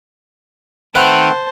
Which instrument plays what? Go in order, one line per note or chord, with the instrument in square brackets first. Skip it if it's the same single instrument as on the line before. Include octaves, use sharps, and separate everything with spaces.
[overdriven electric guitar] D#3 [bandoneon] A3 C4 [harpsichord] B4 E5 F#5 [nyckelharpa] C5 A5